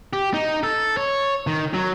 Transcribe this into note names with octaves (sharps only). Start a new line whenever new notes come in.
G4
D#4
A4
C#5
D#3
F#3